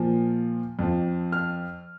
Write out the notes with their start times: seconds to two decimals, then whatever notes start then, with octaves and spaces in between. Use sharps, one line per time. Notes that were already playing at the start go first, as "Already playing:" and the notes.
Already playing: A#2 F3
0.79 F2 F3
1.32 F6